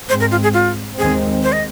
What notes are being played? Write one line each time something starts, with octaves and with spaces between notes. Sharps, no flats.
G#2 G#3 C4 C5
A#4
F4
G#4
F4
D#2 D#3 G#3 C4 G#4
C5
D#5